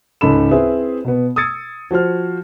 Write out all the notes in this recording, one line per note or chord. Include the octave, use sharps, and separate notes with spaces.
C#2 G#2 C#4 A4 B5 E7
C4 E4 G#4 B4 C5 E5
B2 B3
D#6 E6 G#6 A6 C#7
F3 F#4 C5 F6